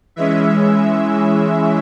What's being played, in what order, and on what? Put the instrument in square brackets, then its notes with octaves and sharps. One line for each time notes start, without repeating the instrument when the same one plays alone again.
[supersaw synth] E3 G#3 C#4 E5